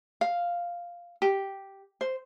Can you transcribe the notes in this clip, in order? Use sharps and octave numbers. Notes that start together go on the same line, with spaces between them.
F5
G4
C5